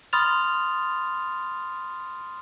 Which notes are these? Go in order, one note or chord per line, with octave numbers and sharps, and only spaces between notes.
B5 C6 D#6 F6 A6 F7